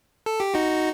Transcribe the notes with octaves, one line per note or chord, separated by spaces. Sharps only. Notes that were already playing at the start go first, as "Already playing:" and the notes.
A4
G4
D#4 F#4